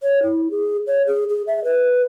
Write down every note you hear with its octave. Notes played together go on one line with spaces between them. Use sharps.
C#5
E4
G#4
C#5
G#4
G#4
E5
B4